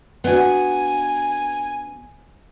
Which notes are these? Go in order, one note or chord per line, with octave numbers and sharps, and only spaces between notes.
B3 D4 F#4 G#5